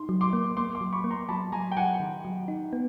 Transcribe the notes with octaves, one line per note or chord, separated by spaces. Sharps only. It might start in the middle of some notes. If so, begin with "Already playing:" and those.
Already playing: D#4 C6
F#3
C6 D6
A#3
A#3 C6 D6
C6 D6
F#3
B5 C#6
A#3
A#5 C6
F#3 A5 B5
F#3 G#5 A#5
G5
F#3 F#5 G#5
D#3
F#3
D#4
B3